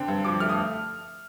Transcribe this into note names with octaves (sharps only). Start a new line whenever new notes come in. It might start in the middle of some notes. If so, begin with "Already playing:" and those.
Already playing: D3 C4
G2
F3 D6
A3 F6
D#6